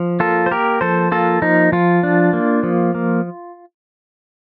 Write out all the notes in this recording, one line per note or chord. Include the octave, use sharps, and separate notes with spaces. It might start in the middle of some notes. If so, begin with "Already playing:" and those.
Already playing: F3
A#3 F4 A4
C5
A#3 G4 A#4
F3 A4 C5
A#3 F4 A4
F3 D#4
F3 F4
D4
A#3
F3
A#3